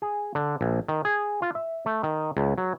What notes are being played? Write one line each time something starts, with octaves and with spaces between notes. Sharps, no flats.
G#4
D3
A#1
D#3
G#4
F4
E5
A3
D#3
C#2
F#3